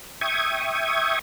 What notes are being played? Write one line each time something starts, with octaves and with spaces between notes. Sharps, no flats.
E5 G5 C#6 D#6 G#6